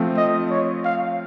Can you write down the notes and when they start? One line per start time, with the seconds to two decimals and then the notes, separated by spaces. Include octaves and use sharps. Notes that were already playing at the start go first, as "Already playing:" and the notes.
Already playing: F3 A3 C4 F4
0.17 D#5
0.51 C#5
0.85 F5